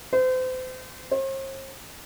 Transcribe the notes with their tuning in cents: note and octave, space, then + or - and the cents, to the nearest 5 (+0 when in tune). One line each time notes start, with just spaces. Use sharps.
C5 -35
C5 +45